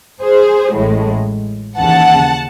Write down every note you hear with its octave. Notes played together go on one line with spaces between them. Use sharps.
G#4 C5
A1 A2 G#3
D#2 C#3 E3 F#5 A5